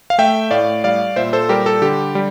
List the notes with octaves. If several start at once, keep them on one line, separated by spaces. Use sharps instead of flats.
F5
A3 E5 G5
A2 D5 F5
G3 D5 F5
A#2 C5 E5
A4 C5
G3 G4 A#4
A4
D3 G4
G3